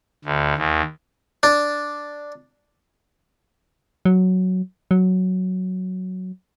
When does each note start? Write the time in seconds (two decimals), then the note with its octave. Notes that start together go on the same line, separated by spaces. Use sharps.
0.25 D2
0.57 D#2
1.43 D4
4.05 F#3
4.91 F#3